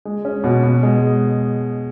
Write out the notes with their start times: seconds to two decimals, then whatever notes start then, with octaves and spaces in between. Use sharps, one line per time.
0.05 G#3
0.25 C#4
0.44 B2
0.63 B2
0.83 G#3